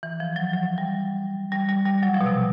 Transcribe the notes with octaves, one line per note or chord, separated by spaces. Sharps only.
E3
F3
F#3
F#3
G3
G3
G3
G3
F#3
F3
B2
C3